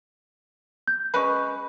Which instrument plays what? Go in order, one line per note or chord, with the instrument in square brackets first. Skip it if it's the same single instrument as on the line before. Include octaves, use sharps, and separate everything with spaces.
[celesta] G6
[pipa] G#3 C#4 B4 [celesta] B5 C#6